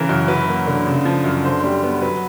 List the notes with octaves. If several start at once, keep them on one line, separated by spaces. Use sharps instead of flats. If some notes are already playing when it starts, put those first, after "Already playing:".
Already playing: C#3 E3 A#4
F#2
F#3 B4
A#3
D3
C#3
F3
F#2
D3 C5
G3
B3
F#3 B4